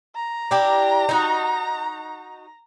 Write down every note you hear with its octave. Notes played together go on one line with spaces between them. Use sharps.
A#5
D4 E4 G4
D#4 E4 F#4